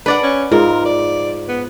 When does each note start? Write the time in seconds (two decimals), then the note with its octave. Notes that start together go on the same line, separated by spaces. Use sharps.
0.06 D4 B4 D5 F#5
0.23 C#4
0.52 G#2 F4 A#4
0.85 D5
1.48 B3